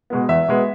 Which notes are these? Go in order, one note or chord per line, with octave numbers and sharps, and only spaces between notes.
B2 G#3 B3
E2 E5
B2 G#3 B3